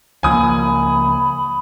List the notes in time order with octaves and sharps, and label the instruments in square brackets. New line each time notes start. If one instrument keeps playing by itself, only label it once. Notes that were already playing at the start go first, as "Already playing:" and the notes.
[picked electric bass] C#2 F3 A#3 [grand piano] G#5 D#6 [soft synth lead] B5